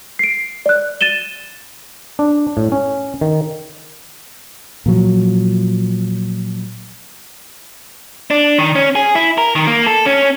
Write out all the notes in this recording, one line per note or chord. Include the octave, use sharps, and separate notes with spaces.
C7 D7
D5 F#6
A6 D#7 E7 G7
D4
A2
C#4
D#3
A#2 F3 F#3
D4
D#3
C#4
G#4
E4
A#4
D#3
A#3
A4
C#4